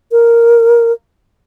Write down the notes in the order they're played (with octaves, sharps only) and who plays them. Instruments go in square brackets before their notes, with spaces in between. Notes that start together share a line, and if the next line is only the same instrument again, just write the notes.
[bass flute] A#4